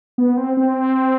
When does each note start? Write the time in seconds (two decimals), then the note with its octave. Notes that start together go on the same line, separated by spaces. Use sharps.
0.18 B3
0.37 C4
0.57 C4